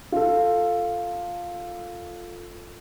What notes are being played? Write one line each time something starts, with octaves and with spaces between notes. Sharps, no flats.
F4 A4